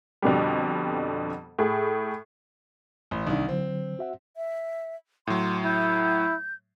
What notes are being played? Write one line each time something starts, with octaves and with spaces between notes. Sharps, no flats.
F2 B2 D3 G3
A2 G#4
A1
C2 D#3 D4
D3 F#3 C4
F#4 E5 F#5
E5
A2 F#3 C6
E4 G6